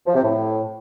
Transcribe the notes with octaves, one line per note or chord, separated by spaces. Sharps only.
F3
C3
A2